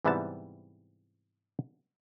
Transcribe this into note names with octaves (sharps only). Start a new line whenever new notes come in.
G#2 C3 E3 G3 B3 A5